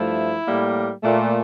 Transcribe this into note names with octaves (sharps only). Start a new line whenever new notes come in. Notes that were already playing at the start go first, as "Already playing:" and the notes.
Already playing: G2 F3 A3 E4
A2 G3 A#3
A#2 A3